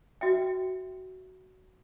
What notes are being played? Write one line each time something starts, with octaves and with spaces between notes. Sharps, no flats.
F#4 E5 G5